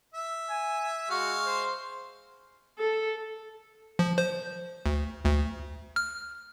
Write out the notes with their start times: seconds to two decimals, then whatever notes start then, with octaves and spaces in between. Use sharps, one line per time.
0.14 E5
0.50 G#5
1.10 G#3 F#4 F5 C#6
1.46 C5
2.79 A4
3.99 F3
4.18 C5
4.86 D2
5.26 D2
5.96 F6